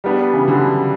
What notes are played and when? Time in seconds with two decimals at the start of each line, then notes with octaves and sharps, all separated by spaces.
0.04 G3 B3 D4
0.33 C#3 E3
0.48 D3 F#3